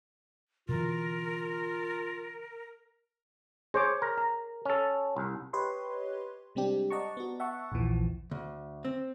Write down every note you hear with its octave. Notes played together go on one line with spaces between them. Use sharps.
B2 D3 E3 F4 A#4
G#4 C5 C#5 D6
A#4
A#5
C#4 A4
C2
G4 B4 C#5 D#5 C6
C3 G3 G#3 C4 D4 G4
D5 D#5 F#5 A5 A#5 C#6
B3 F#4
E5 F#5 A5 C#6
A#1 D#2 A#2 E3 F3
D2
C4